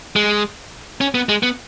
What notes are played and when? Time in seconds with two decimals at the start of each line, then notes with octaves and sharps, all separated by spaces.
0.16 G#3
1.01 C#4
1.15 B3
1.29 G#3
1.43 B3